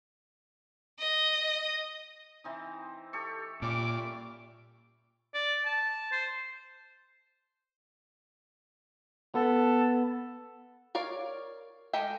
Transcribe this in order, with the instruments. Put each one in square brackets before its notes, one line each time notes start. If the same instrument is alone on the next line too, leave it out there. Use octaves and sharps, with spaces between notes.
[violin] D#5
[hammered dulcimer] E3 C4 D#4
G4 A4 C#6
[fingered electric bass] A#2 [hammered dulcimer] G3 C#4 [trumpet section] D6
[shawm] D5
A5
C5
[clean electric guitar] B3 [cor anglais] A4
[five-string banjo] A#4 C#5 D5 F5
G#3 G4 A4 A#4 G5